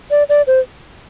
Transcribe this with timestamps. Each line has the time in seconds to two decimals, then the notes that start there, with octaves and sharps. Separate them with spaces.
0.11 D5
0.29 D5
0.47 C5